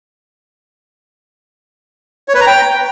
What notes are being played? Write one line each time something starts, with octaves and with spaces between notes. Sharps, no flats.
C#5
B4
A#5
G5